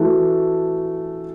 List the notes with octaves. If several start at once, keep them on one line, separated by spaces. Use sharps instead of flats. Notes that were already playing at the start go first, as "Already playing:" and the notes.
Already playing: E3 A3 F#4 A4